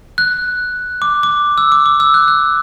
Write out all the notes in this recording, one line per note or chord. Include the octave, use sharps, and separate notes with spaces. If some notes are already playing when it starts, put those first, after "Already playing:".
F#6
D6
D6
E6
D6
D6
E6
F#6
F#6